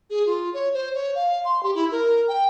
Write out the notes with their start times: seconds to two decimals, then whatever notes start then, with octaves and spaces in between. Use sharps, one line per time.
0.10 G#4
0.26 F4
0.54 C#5
0.74 C5
0.95 C#5
1.15 F5
1.45 C6
1.63 G4
1.75 E4
1.92 A#4
2.28 G5